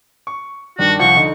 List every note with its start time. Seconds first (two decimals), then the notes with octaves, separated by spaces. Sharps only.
0.27 C#6
0.79 G2 D#3 D4 F#4
0.99 C2 F3 F#5 C#6
1.16 D3 D#4